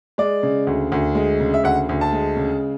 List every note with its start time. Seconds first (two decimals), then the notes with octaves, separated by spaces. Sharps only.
0.18 G#3 D5
0.43 C#3
0.67 D2
0.92 D2
1.15 G#3
1.40 C#3
1.54 E5
1.64 D2 F#5
1.89 D2
2.01 A5
2.13 G#3
2.37 C#3